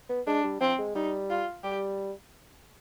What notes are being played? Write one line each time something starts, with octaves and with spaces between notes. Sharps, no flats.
B3
G#3 D4
G3
F3 C4
G#3
G3 D#4
F4
G3 G4